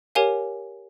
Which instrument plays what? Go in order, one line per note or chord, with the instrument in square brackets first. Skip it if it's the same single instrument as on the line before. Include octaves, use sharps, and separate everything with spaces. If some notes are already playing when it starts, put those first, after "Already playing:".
[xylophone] G4 A#4 C#5 F5 G#5